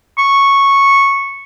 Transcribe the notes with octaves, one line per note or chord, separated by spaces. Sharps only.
C#6